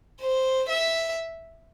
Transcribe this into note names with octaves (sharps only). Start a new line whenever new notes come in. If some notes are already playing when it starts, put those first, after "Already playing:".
C5
E5